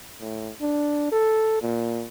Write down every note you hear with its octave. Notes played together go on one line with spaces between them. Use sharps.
A2
D4
A4
A#2